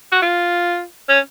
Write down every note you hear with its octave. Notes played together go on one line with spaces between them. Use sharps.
F#4
F4
C#4